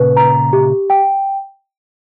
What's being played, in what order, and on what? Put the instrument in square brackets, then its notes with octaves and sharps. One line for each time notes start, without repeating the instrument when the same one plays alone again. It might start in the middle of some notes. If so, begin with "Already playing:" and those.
Already playing: [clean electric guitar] A#2 C#3 [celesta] B4
[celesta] A#5
G4
G5